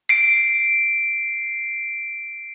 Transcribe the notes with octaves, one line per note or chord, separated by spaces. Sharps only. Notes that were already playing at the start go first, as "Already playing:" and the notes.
C7 D7